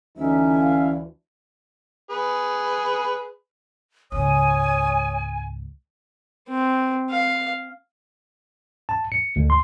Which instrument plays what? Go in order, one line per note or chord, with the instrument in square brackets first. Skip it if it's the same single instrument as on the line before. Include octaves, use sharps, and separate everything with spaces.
[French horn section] D2 E3 [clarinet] C#4 [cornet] D#4 [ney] E5
[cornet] F5
[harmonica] G#4 B4
[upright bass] C#2 G#2 [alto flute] C#5 [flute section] G#5 [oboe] D#6
[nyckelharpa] C4
F5
[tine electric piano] A5
C#7
D2
C6